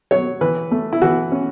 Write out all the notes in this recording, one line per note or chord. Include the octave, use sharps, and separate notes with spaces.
F#3 C#5
E3 B4
A3
E4
E3 F#4
C#4